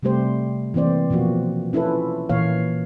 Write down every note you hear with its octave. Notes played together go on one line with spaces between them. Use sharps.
C3 G3 A3 G4 C5
E3 A#3 C4 C5 D5
B2 F3 A#3 F#4
C#4 E4 F4 A4 B4
A#2 E3 A#3 C#5 F5